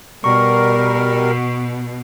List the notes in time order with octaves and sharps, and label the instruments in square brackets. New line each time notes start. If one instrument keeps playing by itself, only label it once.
[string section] B2 [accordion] G3 A#4 [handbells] C#6